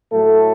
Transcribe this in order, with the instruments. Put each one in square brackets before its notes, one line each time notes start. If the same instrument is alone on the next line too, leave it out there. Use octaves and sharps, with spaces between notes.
[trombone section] A2 F#3 A3 A4